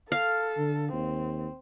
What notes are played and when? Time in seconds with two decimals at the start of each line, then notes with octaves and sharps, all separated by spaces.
0.12 A4 F5
0.57 D3
0.93 D#2 C4